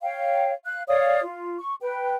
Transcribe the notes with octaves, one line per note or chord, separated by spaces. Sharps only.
C#5 F5 G5
F5 F#6
C#5 D5 F5 D#6
F4
C#6
B4 G5